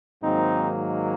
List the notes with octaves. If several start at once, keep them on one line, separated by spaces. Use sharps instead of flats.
G#2 D#3 F#3 A#3 C4 D#4